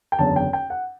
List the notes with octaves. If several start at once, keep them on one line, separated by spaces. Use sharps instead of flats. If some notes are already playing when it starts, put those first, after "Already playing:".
G5
F#1 E2 D3 A5
G5
G5
F#5